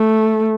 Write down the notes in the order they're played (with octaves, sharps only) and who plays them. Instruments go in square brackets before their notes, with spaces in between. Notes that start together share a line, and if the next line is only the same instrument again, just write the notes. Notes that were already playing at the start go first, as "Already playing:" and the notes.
Already playing: [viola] A3